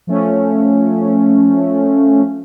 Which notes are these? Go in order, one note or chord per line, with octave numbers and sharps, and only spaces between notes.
F3 A3 C#4